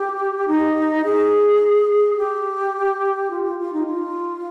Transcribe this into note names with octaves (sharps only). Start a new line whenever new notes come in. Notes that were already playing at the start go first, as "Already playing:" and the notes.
Already playing: G4
D#4
G#4
G4
F4
F4
F4
D#4
F4